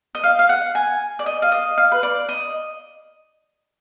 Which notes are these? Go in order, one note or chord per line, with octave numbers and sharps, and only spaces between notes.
D#5
F5
F5
F#5
G#5
D5
D#5
F5
D#5
F5
B4
D5
D#5